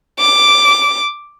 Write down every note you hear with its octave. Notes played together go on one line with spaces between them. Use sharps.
D6